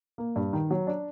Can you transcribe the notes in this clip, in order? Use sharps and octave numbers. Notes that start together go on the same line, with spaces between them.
A#3
G2
D#3
F#3
D4